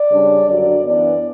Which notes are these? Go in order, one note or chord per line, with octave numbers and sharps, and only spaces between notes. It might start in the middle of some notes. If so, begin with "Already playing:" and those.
Already playing: D5
C#3 G3 D4
F#2 D3 F#3 C#4 D5
F#2 E3 B3 D4 D5